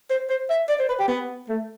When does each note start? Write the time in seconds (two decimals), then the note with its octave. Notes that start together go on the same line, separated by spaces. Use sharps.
0.10 C5
0.29 C5
0.50 E5
0.69 D5
0.80 C5
0.89 B4
0.99 G4
1.08 B3
1.49 A3